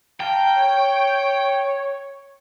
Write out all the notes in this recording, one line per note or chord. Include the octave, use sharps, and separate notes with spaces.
F5 G5 A5 A#5
C#5